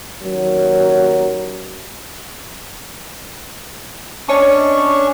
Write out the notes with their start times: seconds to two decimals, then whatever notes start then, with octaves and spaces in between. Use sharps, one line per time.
0.22 D#2 F#3 C#4 A#4
4.29 C#4 D4 C#5 D#5 A5 C#6